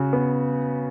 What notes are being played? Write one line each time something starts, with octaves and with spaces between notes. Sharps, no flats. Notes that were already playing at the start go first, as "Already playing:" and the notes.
Already playing: C#3 F#4
B3